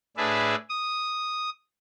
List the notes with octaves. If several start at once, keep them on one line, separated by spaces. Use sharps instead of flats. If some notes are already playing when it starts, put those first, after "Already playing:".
A2 D4 G#4 B4 D5 E5
D#6